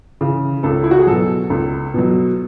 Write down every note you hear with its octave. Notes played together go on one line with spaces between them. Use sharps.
C#3 E3
C#2 A4
E4
F#4
G#4
B2 F#3 A4
C#2
B2 F#3